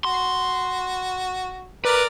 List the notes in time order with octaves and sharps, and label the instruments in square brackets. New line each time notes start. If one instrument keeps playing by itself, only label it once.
[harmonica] F#4 [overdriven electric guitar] C6
[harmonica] A#4 D5 [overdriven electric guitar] B4